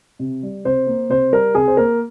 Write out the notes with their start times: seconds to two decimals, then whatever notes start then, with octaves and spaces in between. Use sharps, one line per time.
0.19 C3
0.43 G3
0.65 C3 C5
0.87 A#3
1.09 C3 C5
1.32 G3 A#4
1.55 C3 G#4
1.68 C5
1.77 A#3 A#4